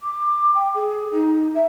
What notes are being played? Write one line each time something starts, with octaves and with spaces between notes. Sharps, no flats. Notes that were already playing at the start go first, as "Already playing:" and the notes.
D6
G5
G#4
D#4
E5